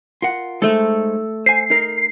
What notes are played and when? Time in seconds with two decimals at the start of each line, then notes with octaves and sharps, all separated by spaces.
0.22 F4 A#4 F#5
0.62 G#3 A3 D#4 A4 C5
1.46 C5 G#5 C7
1.70 D#4 A#4